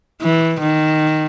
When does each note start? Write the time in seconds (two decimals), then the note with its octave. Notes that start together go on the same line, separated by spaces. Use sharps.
0.22 E3
0.60 D#3